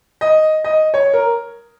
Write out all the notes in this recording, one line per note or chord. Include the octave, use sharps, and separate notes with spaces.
D#5
D#5
C#5
A#4